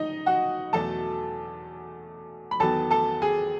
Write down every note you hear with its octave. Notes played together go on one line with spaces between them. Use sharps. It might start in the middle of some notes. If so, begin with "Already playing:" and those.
Already playing: D#4 D#5
F#4 F#5
E2 B2 F#3 A3 A4 A5
B5
E2 D#3 F#3 B3 A4 A5
A4 A5
G#4 G#5